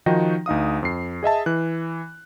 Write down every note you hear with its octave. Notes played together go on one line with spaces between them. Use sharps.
D#3 F3 D#4 F#4 G5 A#6
D2 D#4 F5 D#6
F2 C7
G#4 D#5 E5 A5
E3 F#6